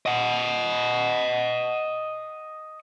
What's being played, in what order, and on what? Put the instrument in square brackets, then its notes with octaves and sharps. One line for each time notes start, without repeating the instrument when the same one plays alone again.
[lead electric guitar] D#5 F#5